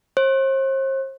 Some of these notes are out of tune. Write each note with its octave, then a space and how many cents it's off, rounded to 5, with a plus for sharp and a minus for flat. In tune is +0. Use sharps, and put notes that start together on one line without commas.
C5 +40